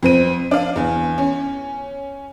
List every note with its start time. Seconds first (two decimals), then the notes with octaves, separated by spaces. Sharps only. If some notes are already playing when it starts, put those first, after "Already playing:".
0.03 F2 C4 D#7
0.51 D4 F5
0.76 E2
1.18 C#4